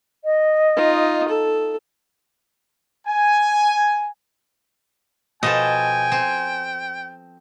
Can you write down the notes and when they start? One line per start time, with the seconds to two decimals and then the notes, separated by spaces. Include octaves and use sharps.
0.24 D#5
0.76 D#4 F4
1.28 A4
3.07 G#5
5.43 B2 F3 A4 D#5 G5 G#5
6.12 C4